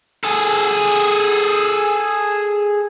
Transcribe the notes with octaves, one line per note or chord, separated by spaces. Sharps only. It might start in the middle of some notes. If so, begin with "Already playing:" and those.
G#4 A4